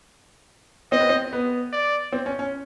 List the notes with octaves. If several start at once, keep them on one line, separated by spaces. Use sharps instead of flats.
C4 D#5
B3
C4
B3
D5
C4
C#4
C#4